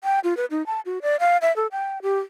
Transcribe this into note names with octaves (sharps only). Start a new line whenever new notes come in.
G5
F4
B4
D#4
A5
F#4
D5
F5
E5
A4
G5
G4